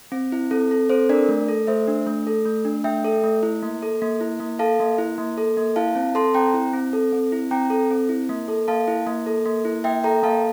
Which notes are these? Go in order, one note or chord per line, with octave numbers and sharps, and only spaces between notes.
C4
E4
C4 A4
A4
C4 A4 C5
D4 A#4 D5
A3
A4
A3 C5 E5
D4
A3
A4
A3
D4
A3 E5 G5
A4
A3
E4
A#3
A4
A#3
E4
A#3
A4 F5 A5
A#3
E4
A#3
A4
A#3
E4 F5 A5
C4
A4 A5 C6
C4 G5 A#5
E4
C4
A4
C4
E4
C4 G5 A#5
A4
C4
E4
A#3
A4
A#3 F5 A5
E4
A#3
A4
A#3
E4
A#3 E5 G5
A4 G5 A#5
A#3 F5 A5